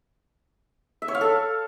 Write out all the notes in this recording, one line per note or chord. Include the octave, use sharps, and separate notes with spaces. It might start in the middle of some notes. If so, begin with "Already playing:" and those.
E5
C#5
F5
A4